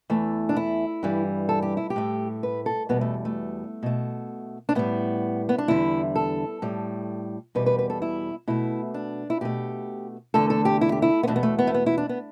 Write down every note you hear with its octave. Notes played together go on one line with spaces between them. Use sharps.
E2 E3 A3
D4
E4
G2 E3 G3
A4
G4
E4
G4
A2 A3
B4
A4
E2 B2 G3 B3
A3
A3
B2 A3
D4
A2 G3 B3
B3
D4
E2 D3 G3 E4
A4
A2 G3
E2 B2 G3 B4
B4
B4
A4
E4
B2 A3 E4
D4
E4
B2 A3 G4
E2 D3 A3 A4
A4
G4
E4
G4
E4
B3
E2 B2 A3 D4
B3
A3
B3
A3
B3
E4
D4
B3